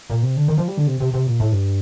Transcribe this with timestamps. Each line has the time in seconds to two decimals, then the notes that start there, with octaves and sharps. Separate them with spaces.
0.10 A#2
0.22 C3
0.36 D3
0.48 D#3
0.58 F3
0.68 G3
0.77 D3
0.87 C3
1.00 C3
1.14 C3
1.27 A#2
1.40 A2
1.52 G2